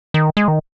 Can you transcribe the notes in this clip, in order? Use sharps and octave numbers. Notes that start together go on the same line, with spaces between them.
D#3
G#3
D#3